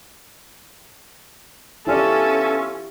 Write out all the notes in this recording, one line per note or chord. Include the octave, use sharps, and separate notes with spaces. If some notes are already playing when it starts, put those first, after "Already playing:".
B3 C#4 E4 F4 G4 A4 D5 E5